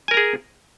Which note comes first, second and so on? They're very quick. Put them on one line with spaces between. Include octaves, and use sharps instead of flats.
G#5 A#4 A#5 G#4